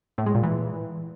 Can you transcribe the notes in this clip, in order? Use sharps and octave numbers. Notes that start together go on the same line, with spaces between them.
A2
G#3
A#2
E3